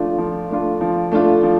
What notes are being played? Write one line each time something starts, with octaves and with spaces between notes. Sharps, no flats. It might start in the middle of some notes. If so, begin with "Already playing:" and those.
Already playing: F3 A3 D4 F4
F3
A3 D4 F4
F3
A3 D4 F4
F3